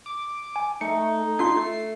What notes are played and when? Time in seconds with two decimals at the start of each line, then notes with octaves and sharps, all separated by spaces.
0.06 D6
0.56 G#5
0.81 A3 D#4 C#7
1.39 D4 F4 C6 C7
1.56 A3